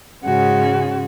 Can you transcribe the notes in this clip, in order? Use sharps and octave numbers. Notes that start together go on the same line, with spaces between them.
G#2 C#3 G#3 C#4 F#4